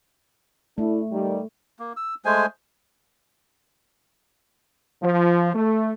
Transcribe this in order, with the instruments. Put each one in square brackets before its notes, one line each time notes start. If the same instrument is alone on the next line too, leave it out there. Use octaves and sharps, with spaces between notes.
[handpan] A3 [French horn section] D4 E4
[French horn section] D#3 G3
[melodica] A#3
E6
G#3 A3 C5 G#5
[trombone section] F3
A3